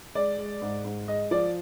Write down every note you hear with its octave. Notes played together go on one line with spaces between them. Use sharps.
G#3 D5
G#3
G#2
G#2
G#3 D#5
F3 D5